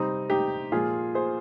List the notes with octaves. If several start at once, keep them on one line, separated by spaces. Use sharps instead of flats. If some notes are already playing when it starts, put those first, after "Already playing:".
Already playing: C3 G3 C4 D#4
D#4 G4
A#2 F3 G#3 F4 G#4
G#4 C5